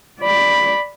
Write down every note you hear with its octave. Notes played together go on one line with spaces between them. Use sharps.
D5 B5